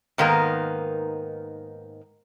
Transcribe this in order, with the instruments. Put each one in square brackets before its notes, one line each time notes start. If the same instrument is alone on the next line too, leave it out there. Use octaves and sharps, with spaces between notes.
[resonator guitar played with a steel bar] G#2 D#3 A#3 B3 A#4